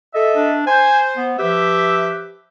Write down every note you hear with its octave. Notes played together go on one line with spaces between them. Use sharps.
A4 D#5 E5
D4
C5 G#5
B3
F3 G4 B4 E5